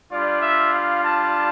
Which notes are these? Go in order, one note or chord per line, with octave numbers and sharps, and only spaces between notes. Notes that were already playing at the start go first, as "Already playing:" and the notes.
G3 D4 F4 D5
E5
F5
A5